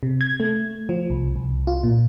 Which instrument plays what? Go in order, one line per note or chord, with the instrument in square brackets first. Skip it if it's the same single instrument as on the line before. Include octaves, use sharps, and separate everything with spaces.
[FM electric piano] C3
G#6
A3
F3
C2
C2
F4
A#2